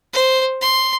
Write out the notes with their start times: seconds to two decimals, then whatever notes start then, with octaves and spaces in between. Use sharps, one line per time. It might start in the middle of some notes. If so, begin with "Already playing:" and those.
0.13 C5
0.61 C6